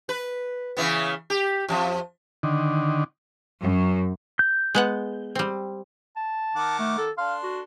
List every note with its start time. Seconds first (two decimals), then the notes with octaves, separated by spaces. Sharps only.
0.09 B4
0.77 C#3 E3 B3
1.30 G4
1.69 F2 A#2 F3
2.43 D3 D#3
3.59 F#2
4.39 G6
4.75 G#3 B3 F#5
5.35 G3 C4
6.16 A5
6.56 D#3 F#5 D6
6.79 A3
6.98 A4
7.18 D4 A4 F5 C6
7.44 F#4